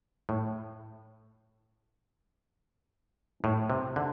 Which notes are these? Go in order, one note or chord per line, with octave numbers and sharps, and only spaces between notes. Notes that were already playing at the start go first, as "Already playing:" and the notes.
A2
A2
C3
D3